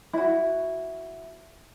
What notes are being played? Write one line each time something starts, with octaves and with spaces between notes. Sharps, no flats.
E4 F#4